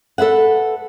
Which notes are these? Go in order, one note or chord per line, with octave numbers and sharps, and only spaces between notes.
A4 B4 E5 F#5